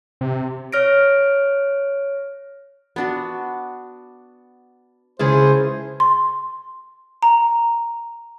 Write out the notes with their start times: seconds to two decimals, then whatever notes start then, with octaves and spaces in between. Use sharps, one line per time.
0.21 C3
0.73 C#5 F6 A#6 D7
2.96 B3 D4 F#4
5.20 C#2 C#4 E4 G#4 C5 A5
6.00 C6
7.23 A#5